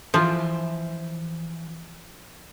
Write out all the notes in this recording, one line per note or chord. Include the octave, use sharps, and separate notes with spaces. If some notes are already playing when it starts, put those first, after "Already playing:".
E3 F3 C5 E5